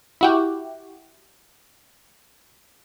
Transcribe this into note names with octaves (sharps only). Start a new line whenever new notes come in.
E4 F#4 G4